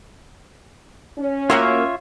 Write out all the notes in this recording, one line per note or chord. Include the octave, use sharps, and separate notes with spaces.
C#4
A#3 F4 F#4 A#4 C#5 E5